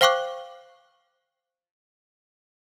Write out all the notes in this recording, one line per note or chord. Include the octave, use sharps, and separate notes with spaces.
C5 F5 G5 C#6 D6 F#6